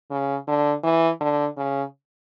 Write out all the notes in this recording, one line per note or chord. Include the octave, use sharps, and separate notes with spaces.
C#3
D3
E3
D3
C#3